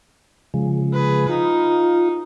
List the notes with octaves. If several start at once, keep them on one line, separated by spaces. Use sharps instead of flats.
C#3 F3 G#3
G#4 B4
D#4 F4